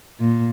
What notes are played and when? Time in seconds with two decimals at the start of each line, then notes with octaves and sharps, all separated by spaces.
0.20 A#2